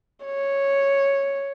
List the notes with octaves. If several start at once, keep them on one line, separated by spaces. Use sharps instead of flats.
C#5